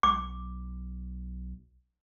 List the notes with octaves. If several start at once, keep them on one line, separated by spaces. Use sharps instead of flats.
B1 D6